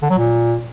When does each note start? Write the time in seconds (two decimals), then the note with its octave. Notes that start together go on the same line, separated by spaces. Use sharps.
0.02 D3
0.10 F#3
0.19 A#2